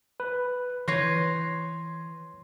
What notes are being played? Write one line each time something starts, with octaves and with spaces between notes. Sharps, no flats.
B4
E3 B4 C#5 C6 A#6 C7